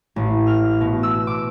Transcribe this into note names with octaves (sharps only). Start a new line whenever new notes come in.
A1
F6
B2
E6
D6